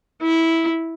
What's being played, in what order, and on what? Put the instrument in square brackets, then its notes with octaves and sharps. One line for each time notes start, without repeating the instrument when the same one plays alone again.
[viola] E4